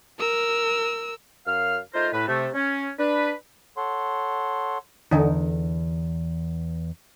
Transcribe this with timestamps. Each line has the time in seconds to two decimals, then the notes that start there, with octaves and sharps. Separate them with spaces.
0.19 A#4 E6
1.46 F#2 F5 F6
1.94 A3 D#4 F4 A#4 C5
2.12 A2 B4
2.27 C3 A3
2.54 C#4
2.98 D4 B4
3.77 A4 C#5 F#5 C6
5.11 E2 D3 D#4